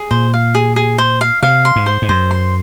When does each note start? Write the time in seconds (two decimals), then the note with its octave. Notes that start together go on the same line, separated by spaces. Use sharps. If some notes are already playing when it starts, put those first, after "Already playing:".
Already playing: G#4
0.11 A#2 C5
0.34 F5
0.55 G#4
0.76 G#4
0.98 C5
1.21 F5
1.43 C3 F5
1.65 C6
1.76 G#2
1.86 C5
2.02 G#2
2.09 F#2 C5
2.31 C6